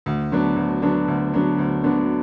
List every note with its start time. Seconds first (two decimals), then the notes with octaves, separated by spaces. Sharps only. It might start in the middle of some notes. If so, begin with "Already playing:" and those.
0.06 D2
0.32 D3 F#3 B3 D4
0.56 D2
0.82 D3 F#3 B3 D4
1.08 D2
1.33 D3 F#3 B3 D4
1.59 D2
1.83 D3 F#3 B3 D4